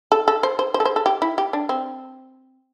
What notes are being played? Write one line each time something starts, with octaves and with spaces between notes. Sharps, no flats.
A4
A4
C5
C5
C5
A4
C5
A4
G4
E4
G4
D4
C4